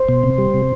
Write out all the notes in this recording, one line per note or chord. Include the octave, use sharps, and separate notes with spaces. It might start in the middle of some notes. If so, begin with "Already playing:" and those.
Already playing: C5
B2
C3
G3
C3